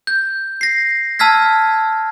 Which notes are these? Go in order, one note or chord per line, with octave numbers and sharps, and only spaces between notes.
G6
A#6 C7
A5 E6 F6 G#6 B6